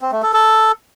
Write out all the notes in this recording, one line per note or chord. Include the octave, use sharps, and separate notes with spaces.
C4
A3
A4
A4